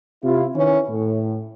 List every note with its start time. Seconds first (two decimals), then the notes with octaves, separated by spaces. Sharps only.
0.24 C3 E4 F4
0.55 D#3 E3 C#4
0.89 A2